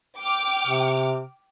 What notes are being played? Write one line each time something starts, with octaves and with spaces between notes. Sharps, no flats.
G5 D6 F6
C3